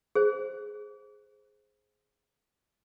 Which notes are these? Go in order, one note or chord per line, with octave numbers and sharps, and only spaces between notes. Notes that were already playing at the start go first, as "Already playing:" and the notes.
G#4 C5